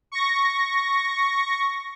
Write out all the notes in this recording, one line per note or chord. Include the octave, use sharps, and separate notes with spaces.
C#6 A#6